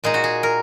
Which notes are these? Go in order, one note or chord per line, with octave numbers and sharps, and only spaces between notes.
A#2 G#3 D#4 G#4
F#4
G#4
A#4